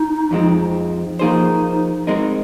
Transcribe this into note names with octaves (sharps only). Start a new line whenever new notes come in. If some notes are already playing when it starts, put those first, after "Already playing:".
Already playing: D#4
F2 F3 G#3 C4
F3 A#3 D#4 G#4 C5
G#3 C4 D#4 A#4